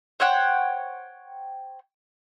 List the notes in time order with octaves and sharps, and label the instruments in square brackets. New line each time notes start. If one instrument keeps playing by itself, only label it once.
[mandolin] C5 C#5 F#5 G5